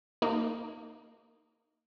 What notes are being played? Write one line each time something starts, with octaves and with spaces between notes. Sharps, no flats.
A#3 D#4